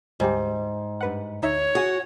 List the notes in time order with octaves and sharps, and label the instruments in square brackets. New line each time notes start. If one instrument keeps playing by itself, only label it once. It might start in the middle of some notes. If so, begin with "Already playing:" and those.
[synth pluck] D2 G3 G4 [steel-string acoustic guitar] G#2
[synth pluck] G2 B4 F#5
[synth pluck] D2 D#4 E5 [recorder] C#5
[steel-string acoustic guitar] F#4 [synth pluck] G#4 G#5